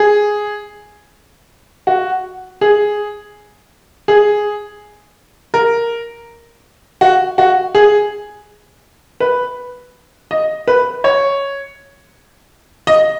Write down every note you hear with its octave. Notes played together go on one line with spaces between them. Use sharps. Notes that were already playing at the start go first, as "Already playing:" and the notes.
Already playing: G#4
F#4
G#4
G#4
A#4
F#4
F#4
G#4
B4
D#5
B4
C#5
D#5